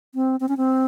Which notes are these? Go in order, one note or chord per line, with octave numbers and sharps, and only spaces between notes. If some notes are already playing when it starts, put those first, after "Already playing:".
C4
C4
C#4
C4